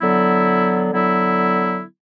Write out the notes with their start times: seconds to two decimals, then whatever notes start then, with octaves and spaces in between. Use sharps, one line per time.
0.01 D3 F#3 B3 E4
0.93 D3 F#3 B3 E4